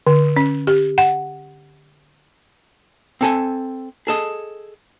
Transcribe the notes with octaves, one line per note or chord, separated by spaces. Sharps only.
D3
C#4
G4
F#5
C4 A4 G#5
G#4 A4 D#5